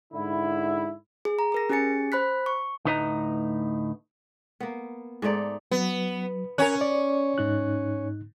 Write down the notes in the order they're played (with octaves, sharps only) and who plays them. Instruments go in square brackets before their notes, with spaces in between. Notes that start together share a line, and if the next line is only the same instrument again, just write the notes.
[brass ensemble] G#2 D3 E4
[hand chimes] G#4
A#5
G#4 A#4 A#6
C#4 G4 G#4 G#5 A6 C#7
C5 B5 F#6 B6
C#6
[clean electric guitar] D2 A2 D#4 B4 D#5 A#5
[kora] A#3 B3
G#2 A3 D#4 D5
[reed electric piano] F#3 [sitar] B3
[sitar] C#4 C#5 [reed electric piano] A#4 G#5 F#6
[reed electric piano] D5
G#2 D#4 F#6